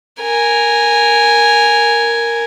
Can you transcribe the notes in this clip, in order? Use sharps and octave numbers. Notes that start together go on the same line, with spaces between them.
A#4 G#5